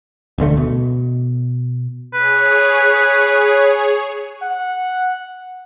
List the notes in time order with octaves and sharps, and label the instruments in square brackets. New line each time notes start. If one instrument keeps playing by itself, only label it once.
[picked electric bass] D1 B1 D3 A3
B2
[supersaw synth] G#4 C#5 [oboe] B4
[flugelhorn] F#5